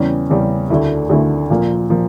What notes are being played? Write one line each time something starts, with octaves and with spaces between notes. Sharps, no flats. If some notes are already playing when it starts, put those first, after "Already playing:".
Already playing: E2 C#3 G3 C#4
E2 C#3 G3 C#4
D2 D3 A3 E4
D2 D3 A3 E4
A#1 A#2 F3 A#3
A#2 F3 A#3